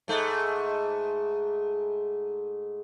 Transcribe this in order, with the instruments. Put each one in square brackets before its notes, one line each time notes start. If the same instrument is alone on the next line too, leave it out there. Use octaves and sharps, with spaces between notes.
[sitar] G#2 A3